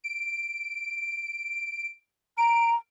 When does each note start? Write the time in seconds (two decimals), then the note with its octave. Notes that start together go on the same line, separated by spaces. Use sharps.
0.04 D7
2.38 A#5 D7